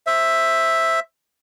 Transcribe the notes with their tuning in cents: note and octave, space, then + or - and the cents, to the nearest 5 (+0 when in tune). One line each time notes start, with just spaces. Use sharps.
C5 +15 E5 +0